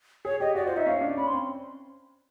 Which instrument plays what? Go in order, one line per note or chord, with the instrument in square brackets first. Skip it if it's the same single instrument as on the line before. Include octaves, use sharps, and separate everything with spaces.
[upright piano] G#4 [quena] C#5
[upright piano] G4 [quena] D#5
[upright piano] F#4 [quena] D5
[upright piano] F4 [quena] C5
[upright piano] D#4 [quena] E5
[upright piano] C#4 [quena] F5
[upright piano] D4
[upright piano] C#4 [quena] B5
[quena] C6
[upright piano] C4